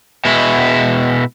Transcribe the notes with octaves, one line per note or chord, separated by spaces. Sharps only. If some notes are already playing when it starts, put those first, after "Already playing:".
B2 G#3 E4